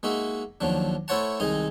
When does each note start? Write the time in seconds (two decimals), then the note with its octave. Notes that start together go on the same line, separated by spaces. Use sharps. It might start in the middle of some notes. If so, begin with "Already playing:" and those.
0.03 G#3 A#3 D#4 F#4 E5
0.61 D#2 F3 F#3 D4
1.08 A3 E4 C5 C#5 F#5 A5
1.40 C2 D#3 G#3 D#4 D#5 G#5